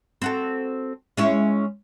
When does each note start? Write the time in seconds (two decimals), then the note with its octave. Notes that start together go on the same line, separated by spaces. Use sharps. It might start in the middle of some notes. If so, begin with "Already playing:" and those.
0.22 C4 F#4 A4
1.17 G#3 C#4 E4